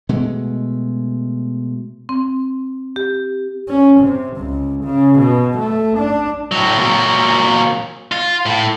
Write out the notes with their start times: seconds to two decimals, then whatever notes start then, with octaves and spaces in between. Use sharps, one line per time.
0.09 B2 G#3 A3
2.09 C4
2.96 G4
3.68 C#4
4.01 C3
4.37 C#2
4.85 C#3
5.19 B2
5.58 A3
5.98 D4
6.52 A2 F#3
6.78 A#2 F#3
8.12 F4
8.46 A2